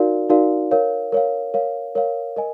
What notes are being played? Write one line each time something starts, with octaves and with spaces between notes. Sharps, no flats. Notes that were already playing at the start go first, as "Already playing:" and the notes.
Already playing: D#4 F#4 A#4 D5 F5
D#4 F#4 A#4 D5 F5
A#4 C#5 F5
A#4 C#5 F5
A#4 C#5 F5
A#4 C#5 F5
A#4 D#5 G#5